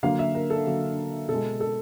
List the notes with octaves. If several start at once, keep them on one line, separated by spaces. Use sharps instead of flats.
D3 F#3 A#3 F5
E5
A#4
A4
D3 F#3 A#3
B2 A4
G#3
A4